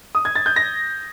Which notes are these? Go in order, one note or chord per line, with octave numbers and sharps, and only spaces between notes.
D#6
G#6
A6
G6
A#6